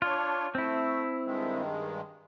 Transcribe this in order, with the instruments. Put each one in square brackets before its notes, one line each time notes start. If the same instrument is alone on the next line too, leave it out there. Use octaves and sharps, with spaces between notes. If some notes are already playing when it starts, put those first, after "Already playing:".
[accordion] D4 C#5 [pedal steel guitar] F4
[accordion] A3 [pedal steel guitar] C4 E4
[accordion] G2 D#3 G#3